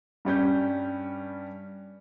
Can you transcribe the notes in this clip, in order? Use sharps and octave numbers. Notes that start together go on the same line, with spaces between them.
G2 G3 C#4 G6